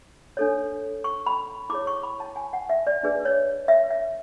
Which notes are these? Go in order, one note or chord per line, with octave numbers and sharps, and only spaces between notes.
D4 A4 C#5
C#6
B5
E4 G#4 C#5 D6
C#6
B5
A5
G#5
F#5
E5
D5
D4 G#4 B4
C#5
E5
E5